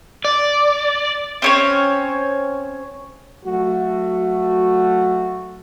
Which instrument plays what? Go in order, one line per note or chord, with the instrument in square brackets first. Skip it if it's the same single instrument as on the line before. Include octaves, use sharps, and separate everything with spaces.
[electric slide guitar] D5
[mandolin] C4 C#4 C#5
[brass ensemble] F#3 A3 F#4